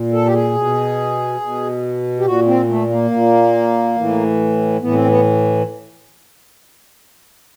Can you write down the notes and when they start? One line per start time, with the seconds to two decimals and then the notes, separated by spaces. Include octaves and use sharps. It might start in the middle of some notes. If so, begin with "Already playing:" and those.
Already playing: A#2
0.13 A4
0.26 G4
0.34 G#4
0.55 B2
1.41 B2
2.19 G4
2.25 A#2 F#4
2.47 C4
2.69 A3
2.89 A#3
3.11 A#2
3.96 A2 E3
4.81 A2 E3 B3
4.94 C4
5.07 B3